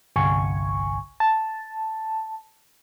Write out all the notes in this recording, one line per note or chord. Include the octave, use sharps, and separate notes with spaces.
G1 C2 G#5 C#6
A5